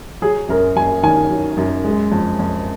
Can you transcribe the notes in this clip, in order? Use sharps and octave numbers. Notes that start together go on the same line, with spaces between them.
F#3 G#4
F#2 A#4
F#2 G#5
D#3 G#5
F#3
F#2
G#3
F2
F2